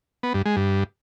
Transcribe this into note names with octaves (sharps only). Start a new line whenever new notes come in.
B3
G2
G#3
G2